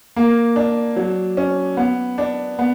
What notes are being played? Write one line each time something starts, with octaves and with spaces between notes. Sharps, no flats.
A#3
D4
F#3
C#4
B3
D4
B3